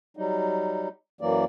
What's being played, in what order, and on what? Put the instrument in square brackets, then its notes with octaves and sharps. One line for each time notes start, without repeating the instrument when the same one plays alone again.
[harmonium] F#3 G3 D#4
F#2 E3 F#3 A#3 D5